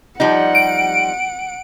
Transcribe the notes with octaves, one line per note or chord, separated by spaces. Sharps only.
F3 G3 D#4 F#5
D7